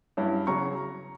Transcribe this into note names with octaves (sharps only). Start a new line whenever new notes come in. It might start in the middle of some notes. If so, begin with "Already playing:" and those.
G2 F#3 C#4 E4
C#3 F#3 A#5 C#6